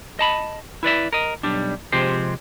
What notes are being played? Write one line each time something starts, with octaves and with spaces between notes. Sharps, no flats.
D#5 A5 B5
E4 B4 D5 E5
A#4 D#5
B1 G3 D4
C3 F3 G#3 C4 G4 C5